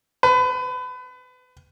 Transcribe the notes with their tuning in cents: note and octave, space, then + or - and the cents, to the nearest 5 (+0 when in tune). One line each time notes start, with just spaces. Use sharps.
B4 +30